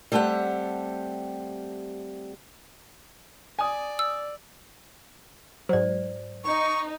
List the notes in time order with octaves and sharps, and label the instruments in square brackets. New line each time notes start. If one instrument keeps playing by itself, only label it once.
[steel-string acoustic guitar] G3 A3 C4 G4 F#5
[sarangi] D5 [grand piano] G#5 D#6
[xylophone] E6
[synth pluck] G#2 F#3 [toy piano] C5 D5
[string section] D#4 [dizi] C#6